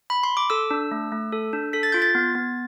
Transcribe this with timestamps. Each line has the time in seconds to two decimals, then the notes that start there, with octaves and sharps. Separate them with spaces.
0.10 B5
0.23 C6
0.37 D6
0.50 A4 E6
0.71 D4
0.91 A3
1.12 A3
1.32 A4
1.53 D4
1.73 A4 B6
1.83 A6
1.92 F4 G6
2.02 A6
2.15 B3
2.35 B3